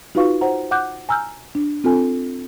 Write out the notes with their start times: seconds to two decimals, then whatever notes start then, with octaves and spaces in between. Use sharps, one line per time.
0.15 D#4 F4 F#4 B4 F5 C#6
0.41 C5 F#5 A#5
0.71 F#5 D6 F#6 G6
1.09 G#5 A#5 E6 F6 G6
1.55 D4
1.84 C4 F4 A4 G#5